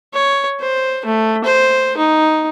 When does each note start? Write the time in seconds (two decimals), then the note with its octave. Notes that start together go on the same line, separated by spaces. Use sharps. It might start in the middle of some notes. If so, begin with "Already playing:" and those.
0.14 C#5
0.61 C5
1.05 A3
1.45 C5
1.98 D#4